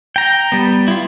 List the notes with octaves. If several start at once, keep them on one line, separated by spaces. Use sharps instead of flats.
G5 A#5
G3 B3
E4 F4